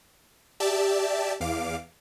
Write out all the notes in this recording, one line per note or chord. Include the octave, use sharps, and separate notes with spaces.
G4 D5 E5 A5
E2 F5 D6